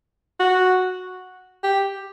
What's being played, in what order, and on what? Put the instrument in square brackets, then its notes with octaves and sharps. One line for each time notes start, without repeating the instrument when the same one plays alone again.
[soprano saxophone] F#4
G4